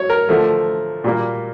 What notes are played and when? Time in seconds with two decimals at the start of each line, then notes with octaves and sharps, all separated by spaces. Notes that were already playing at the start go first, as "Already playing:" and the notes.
Already playing: F#3 C#5
0.10 A#4
0.29 D3 F3 A3
1.04 A#2 G3 A#3